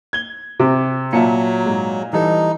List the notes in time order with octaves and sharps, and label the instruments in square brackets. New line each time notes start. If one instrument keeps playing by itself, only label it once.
[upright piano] G#6 G7
[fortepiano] C3 [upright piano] D6
[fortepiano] A#2 [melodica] F#3 [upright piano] E5 A5 C#7
[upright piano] G#2
[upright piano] E3 G3 A4 [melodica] D#4